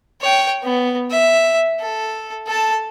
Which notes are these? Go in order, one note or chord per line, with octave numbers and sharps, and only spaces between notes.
C#5 G5
B3
E5
A4
A4 A5